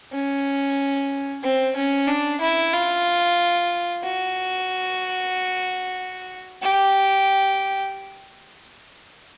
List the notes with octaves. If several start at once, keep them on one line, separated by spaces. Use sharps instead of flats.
C#4
C4
C#4
D4
E4
F4
F#4
G4